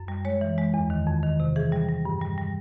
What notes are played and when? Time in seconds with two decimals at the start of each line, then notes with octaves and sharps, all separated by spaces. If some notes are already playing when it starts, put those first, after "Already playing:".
Already playing: F#2
0.08 G3
0.25 G#3 C#5
0.41 E3
0.58 G#3
0.74 E2
0.90 D#3
1.07 F2
1.23 D#3
1.40 C3
1.56 E3 G#4
1.72 G3
1.89 G3
2.05 G2
2.21 G3
2.38 G3